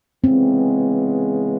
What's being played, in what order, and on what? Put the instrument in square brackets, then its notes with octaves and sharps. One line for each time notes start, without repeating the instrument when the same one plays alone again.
[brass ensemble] C#3 E3 G#3 B3 [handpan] C4